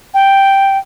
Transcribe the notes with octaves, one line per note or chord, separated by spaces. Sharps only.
G5